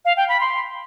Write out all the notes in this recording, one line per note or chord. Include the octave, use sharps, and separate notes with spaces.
F5
G5
B5
C6